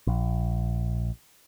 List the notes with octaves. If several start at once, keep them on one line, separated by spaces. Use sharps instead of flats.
A#1